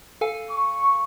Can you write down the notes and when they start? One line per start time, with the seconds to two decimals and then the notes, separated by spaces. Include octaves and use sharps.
0.21 A4 F5 G#5
0.51 C#6